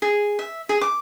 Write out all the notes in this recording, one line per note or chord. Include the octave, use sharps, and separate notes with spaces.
G#4
E5
G#4
D6